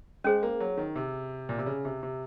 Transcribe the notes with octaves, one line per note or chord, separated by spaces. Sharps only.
G#3 C#4 G#4 C5
A#3
F#3
D#3
C3
A#2
C3
C#3
C3
C3